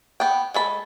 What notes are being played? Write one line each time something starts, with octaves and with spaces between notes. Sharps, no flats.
B3 G5
G#3 A4 B5